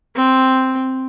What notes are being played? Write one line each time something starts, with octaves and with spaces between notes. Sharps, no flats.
C4